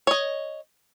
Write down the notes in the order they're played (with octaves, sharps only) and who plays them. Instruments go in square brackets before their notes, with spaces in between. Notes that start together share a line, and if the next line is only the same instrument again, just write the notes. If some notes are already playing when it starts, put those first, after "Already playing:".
[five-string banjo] C#5 D#5